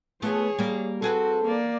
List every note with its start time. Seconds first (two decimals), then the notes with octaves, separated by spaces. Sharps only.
0.22 A3 B3 F4 G#4 C#5
0.59 G3 A#3
1.02 C4 F#4 G#4 A4 B4
1.45 A#3 D5